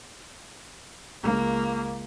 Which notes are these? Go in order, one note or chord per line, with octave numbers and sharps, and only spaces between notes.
C#2 A#3